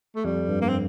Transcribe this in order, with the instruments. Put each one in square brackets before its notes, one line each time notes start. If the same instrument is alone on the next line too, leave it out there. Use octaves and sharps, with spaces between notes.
[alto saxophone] A3
[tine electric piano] F2 [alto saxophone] G3
[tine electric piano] G2
[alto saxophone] A#3
C4